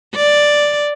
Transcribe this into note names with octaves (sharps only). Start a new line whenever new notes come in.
D5